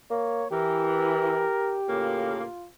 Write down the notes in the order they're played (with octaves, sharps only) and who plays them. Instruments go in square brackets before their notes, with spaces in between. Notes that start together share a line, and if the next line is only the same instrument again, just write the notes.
[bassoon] A#3 [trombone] C#5
[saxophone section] E3 [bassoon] G4 [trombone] A#4
[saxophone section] A2 C#3 A#3 [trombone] F4